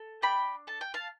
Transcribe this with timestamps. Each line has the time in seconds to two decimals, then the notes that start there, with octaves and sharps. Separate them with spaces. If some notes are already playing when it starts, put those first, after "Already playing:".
Already playing: A4
0.22 D4 G5 B5
0.67 A4 A5
0.81 G5
0.94 F5 A5